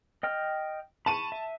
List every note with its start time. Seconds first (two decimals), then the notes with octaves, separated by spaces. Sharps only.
0.23 D#5 G5 F6
1.06 A5 B5 C#6 D#7
1.32 E5